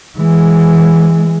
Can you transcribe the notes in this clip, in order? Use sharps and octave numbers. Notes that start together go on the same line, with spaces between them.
E3 G#3